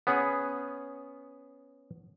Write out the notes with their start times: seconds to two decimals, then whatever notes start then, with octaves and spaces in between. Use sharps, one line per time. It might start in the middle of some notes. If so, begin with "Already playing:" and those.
0.07 B3 C#4 G#4